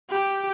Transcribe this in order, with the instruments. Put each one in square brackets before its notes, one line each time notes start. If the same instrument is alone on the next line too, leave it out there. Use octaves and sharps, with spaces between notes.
[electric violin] G4